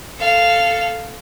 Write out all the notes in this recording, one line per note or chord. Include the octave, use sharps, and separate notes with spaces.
A4 F5